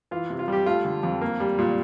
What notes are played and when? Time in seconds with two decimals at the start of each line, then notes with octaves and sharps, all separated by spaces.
0.11 E3 F4
0.30 C3
0.39 F4
0.48 G3 G4
0.66 A3 F4
0.85 D3
1.03 F2
1.21 A#3
1.40 G3
1.59 A#2